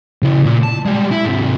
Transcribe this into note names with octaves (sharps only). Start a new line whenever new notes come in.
C#3 E4
A#2
A5
G3 G#3
E4
G#2 C3